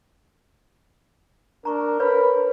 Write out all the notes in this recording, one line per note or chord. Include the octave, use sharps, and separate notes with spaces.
D4 A#4 A#5 C#6
B4 C#5 B5